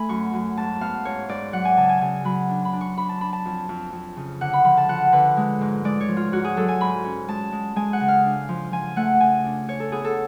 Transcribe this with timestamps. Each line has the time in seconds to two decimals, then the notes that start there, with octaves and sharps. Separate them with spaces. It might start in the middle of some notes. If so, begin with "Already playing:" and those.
Already playing: A3 G#5 B5
0.09 F#2 C#6
0.33 F#2
0.57 G#2 A5
0.81 B3 F5
1.05 G#2 C#5
1.29 G#2 D5
1.53 F#3 F#5
1.65 G#5
1.77 C#3 A5
1.89 G#5
2.01 C#3 G#5
2.25 F#3 B5
2.49 D4
2.65 B5
2.73 D4
2.81 C#6
2.97 D4 B5
3.09 A5
3.20 D4 B5
3.33 A5
3.45 F2
3.69 F2
3.93 F2
4.17 C#3
4.41 D3 F#5
4.53 B5
4.64 F3 B5
4.77 A5
4.88 F3 F#5
5.12 D3 B4
5.37 G#3
5.61 G#2
5.84 G#3 D5
6.01 C#5
6.08 F3
6.17 F4
6.32 G#2 F#4
6.44 G#4
6.57 F#3 A4
6.68 G#5
6.80 G#2 B5
7.04 C#4
7.28 G#3 A5
7.52 G#3
7.76 G#3 G#5
7.93 F#5
8.01 C#3
8.08 F5
8.24 D4
8.49 F3
8.72 F3 G#5
8.96 A3 F#5
9.20 C#3 G#5
9.44 D4
9.68 D4 C#5
9.80 A4
9.92 B3 G#4
10.04 A4